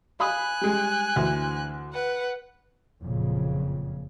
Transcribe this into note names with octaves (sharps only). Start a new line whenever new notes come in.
F5 G#5 B5 D#6 F#6
G3 G#3
D2 D3 E3
B4 F#5
F#1 F2 A#2 C#3